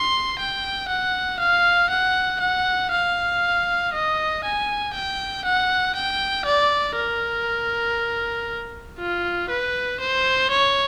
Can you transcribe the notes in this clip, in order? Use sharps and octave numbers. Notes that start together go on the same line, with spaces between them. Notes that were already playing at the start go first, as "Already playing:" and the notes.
Already playing: C6
G5
F#5
F5
F#5
F#5
F5
D#5
G#5
G5
F#5
G5
D5
A#4
F4
B4
C5
C#5